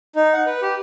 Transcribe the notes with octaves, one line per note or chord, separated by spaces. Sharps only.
D#4
F#5
B4
G4